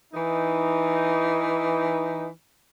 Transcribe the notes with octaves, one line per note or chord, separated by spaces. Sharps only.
E3 D#4